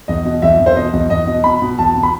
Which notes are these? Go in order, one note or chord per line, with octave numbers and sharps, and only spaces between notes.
E2 D#5
B2
E2 E5
E2
C5
B2 D#5
E2
E2 D#5
B2
B2 B5
B2
E2 A5
B2
B5